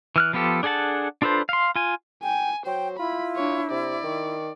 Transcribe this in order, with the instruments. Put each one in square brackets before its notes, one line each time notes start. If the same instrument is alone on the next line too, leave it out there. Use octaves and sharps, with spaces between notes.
[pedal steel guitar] E3 F6 F#6
F3 B3 F4 G4 A4
D4 G#4 A4 F#5 A5
D4 F4 A4 B4 C5
F5 C6
F4 G#5
[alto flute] G5 [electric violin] G#5
[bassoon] F#3 [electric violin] C5 [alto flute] G5
[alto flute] E4 [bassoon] F4 [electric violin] B5
[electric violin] D4 C#5
[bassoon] C3 [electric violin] D5
[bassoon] D#3